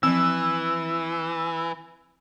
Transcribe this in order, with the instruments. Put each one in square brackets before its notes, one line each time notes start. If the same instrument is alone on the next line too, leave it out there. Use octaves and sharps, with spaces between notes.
[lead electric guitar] E3 [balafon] F3 C4 [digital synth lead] E6